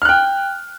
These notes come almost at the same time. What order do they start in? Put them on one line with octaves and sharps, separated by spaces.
F6 F#6 G5